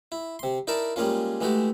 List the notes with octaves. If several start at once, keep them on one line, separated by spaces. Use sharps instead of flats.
E4
C3 C6
D#4 E4 A#4 D5 A5
G3 G#3 A#3 C#4 F4
E3 G#3 A3 F#4 G4